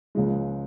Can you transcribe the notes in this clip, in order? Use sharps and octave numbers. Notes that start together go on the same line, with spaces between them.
C#2 C#3 F3 G#3